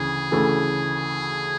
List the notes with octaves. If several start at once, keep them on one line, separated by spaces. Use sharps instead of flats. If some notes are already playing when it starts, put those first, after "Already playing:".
Already playing: D2 C#3 E3 G#4
D2 C#3 E3 A3